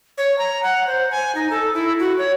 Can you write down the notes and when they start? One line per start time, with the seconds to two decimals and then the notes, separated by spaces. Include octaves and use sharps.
0.18 C#5
0.38 A#5
0.63 F#5
0.87 C5
1.11 G#5
1.35 D#4
1.50 A4
1.74 E4
1.99 F#4
2.18 C#5